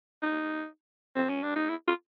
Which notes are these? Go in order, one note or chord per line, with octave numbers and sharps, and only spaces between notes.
D#4
C4
C#4
D4
D#4
E4
F4